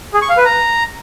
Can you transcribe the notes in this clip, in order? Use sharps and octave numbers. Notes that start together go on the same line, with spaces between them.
G#4
C#6
F5
B4
A#5